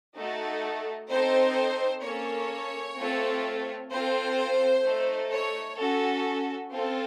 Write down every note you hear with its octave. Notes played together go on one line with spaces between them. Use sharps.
A3 D#4 F#4 A4
C4 D#4 A4 C5
A#3 C#4 A4 C#5
A3 C4 F4 A4
C4 F4 A4 C5
A3 D#4 A4
C#5
C#4 F#4 A4
C4 F4 A4